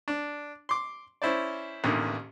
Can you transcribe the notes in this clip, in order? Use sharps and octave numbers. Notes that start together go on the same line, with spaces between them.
D4
C6 D6
C#4 E4 C5 D5
A1 E2 D3 D#3 A#3